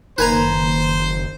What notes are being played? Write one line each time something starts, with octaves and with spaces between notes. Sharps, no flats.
F#1 D#3 A#3 B4 C5 G#5 A#5